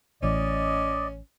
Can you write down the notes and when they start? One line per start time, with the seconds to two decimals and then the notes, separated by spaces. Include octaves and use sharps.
0.23 A1 A2 E3 C#4 D5 D#5